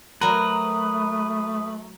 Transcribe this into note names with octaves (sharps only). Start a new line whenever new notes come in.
F#3 A3 A#4 B4 D#6